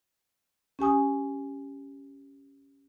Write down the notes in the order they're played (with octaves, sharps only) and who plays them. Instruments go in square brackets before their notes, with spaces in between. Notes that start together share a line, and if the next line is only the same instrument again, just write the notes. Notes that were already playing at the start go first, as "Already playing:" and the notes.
[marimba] C#4 G4 G#5 D#6